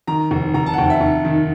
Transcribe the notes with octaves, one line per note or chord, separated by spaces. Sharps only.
D#3 A#5
F1
F1 A#5
A5
F#5
F1 G5
E5
F1
D#3